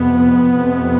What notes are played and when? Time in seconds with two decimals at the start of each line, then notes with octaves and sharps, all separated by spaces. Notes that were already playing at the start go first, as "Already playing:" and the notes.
Already playing: F2 C3 B3
0.57 F2 C3